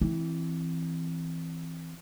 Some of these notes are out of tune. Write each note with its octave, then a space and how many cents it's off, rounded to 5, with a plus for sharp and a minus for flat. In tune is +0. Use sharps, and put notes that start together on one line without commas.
E3 +0 C4 +0